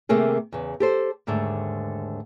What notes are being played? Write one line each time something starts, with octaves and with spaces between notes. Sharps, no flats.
C3 D#3 A3 A#3 G#4
E2 C#3
G4 A4 C5
D#2 G#2 D3 A3